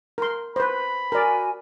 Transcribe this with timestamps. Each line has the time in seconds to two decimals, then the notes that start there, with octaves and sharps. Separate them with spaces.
0.18 A#4 C6
0.56 B4 C5 B5
1.12 F#4 A#4 D5 G#5